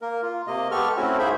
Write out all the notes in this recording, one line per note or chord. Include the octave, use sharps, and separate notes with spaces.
A#3 A#4
F4
C3 A#3 D#5
G#3 B3 G4 A4 C#6 F6
A3 C4 C#4 E4 F#4
G#2 A#3 G#4 C5 E5 B5